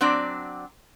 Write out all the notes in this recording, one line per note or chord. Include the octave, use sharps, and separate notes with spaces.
F#3 C4 D4 D5